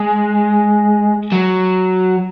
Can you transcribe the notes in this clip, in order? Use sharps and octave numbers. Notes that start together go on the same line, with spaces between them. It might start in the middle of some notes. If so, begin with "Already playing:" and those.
Already playing: G#3
F#3